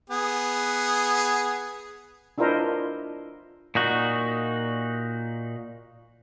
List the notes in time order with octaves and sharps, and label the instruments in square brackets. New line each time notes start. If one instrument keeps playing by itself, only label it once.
[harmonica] B3 G#4
[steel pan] D4 E4 F4 A#4 C5 D#5
[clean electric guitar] A#2 D#4 F#4